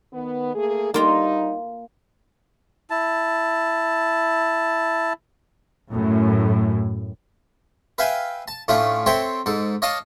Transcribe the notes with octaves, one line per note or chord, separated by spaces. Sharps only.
D#3 B3
A3 A#3 G#4
G3 A#3 D#4 F4 A#5
E4 A5
F#2 A2
B4 E5 F5 G5 G#5
A5
A2 A3 C#4 D4 F4
C4 A4 C#5 E5 G5 C6
G#2 A4
C#5 D#5 F5 A5 D6 D#6